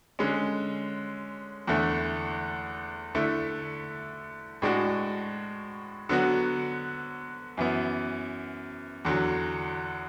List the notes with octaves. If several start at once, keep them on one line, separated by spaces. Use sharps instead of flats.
D3 G#3 C#4
E2 D3 A3
D3 A3 E4
A2 G#3 D4 F#4
D3 F#3 B3 F#4
F#2 E3 B3
E2 D3 F#3